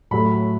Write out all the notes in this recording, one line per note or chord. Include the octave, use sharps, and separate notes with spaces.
A2 F#3 A3 B5